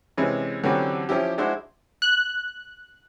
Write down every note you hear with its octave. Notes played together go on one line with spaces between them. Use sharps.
C3 E3 G#3 C#4
D3 E3 F#3 G3 C4 C#4
F3 C#4 E4 G4
G#3 D4 E4 F#4 C5
F#6